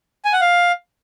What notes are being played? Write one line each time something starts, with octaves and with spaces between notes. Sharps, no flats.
G#5
F#5
F5